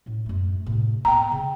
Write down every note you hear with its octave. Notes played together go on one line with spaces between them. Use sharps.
A2 C#4
F#2 A3
A2 C3
A#3 B3 G5 A#5
C#3